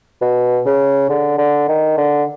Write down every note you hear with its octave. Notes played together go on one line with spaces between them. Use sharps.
B2
C#3
D3
D3
D#3
D3